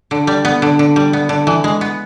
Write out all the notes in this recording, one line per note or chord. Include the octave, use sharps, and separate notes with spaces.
D3
G3
B3
D3
D3
G3
B3
D3
E3
G#3
B3